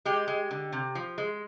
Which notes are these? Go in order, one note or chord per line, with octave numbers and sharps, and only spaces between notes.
G#3 G4
G#3
D3
C3
F3
G#3